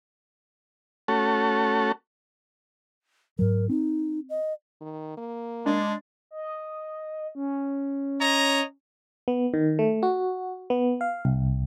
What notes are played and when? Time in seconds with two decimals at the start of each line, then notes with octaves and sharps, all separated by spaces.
1.08 A3 C#4 F#4 A4
3.39 G#2 F#3 A#4
3.69 C4 D#4
4.30 D#5
4.81 D#3
5.17 A#3
5.66 G#3 D4
6.31 D#5
7.35 C#4
8.21 C#5 D#5 A#5
9.28 B3
9.54 D#3
9.79 A3
10.03 F#4
10.70 B3
11.01 F5
11.25 C2